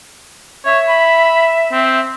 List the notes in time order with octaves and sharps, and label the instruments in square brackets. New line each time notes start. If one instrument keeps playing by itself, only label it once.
[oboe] C#5 [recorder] E5
[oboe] B5
C4